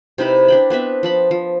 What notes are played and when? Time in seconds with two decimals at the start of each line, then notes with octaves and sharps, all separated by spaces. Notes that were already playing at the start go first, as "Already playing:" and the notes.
0.18 C3 D#4 E4 B4
0.48 D4 G5 B5
0.70 B3 C4 B4 E5
1.03 F3 A5 B5
1.31 F3